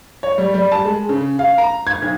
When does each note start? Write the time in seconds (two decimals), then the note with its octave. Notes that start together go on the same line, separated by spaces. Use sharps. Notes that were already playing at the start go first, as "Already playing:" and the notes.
0.23 C#5
0.38 G3
0.54 G3
0.72 A5
0.85 G#3
1.09 C#3
1.39 F5
1.58 A#5
1.87 G#6
2.02 B1